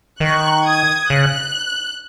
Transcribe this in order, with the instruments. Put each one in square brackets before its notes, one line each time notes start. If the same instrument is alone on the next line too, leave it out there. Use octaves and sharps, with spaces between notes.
[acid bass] D#3 [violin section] C#6 F#6
[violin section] D#6 G#6
[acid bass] C#3 [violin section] F#6